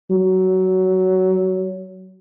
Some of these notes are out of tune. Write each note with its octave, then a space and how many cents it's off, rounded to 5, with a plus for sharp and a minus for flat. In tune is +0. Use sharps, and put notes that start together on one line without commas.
F#3 +15